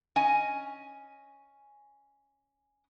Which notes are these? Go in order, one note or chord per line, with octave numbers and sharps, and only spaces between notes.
C#4 D#5 G#5